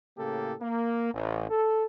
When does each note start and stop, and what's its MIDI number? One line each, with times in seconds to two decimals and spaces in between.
0.17 0.53 45
0.17 0.53 49
0.17 0.53 58
0.17 0.53 67
0.17 0.53 69
0.61 1.12 58
1.13 1.48 33
1.50 1.84 69